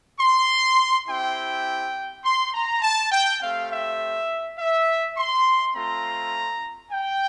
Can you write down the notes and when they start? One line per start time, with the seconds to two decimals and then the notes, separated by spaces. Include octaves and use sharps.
0.19 C6
1.07 C4 E4 G4 G5
2.24 C6
2.52 A#5
2.82 A5
3.11 G5
3.40 A3 C4 G4 F5
3.70 E5
4.57 E5
5.16 C6
5.74 A3 C4 F4 A#5
6.91 G5